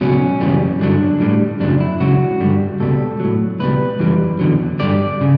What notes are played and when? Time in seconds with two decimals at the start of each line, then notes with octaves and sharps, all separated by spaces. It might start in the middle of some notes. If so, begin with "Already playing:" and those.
0.01 C#2 B2 F#3 C#4
0.40 F#2 C#3 E3 G3
0.80 G2 D3 F#3 D4
1.20 A2 G3
1.60 F#2 C#3 F#3 D4
1.80 E4
2.00 C#2 C#3 F#3 F#4
2.40 G2 D3 G3
2.80 C#2 B2 G3 A4
3.20 A2 F#3
3.59 C#2 B2 G3 B4
3.99 F#2 E3 G3
4.39 E2 D3 F#3
4.79 G2 D3 G3 D5
5.21 C#3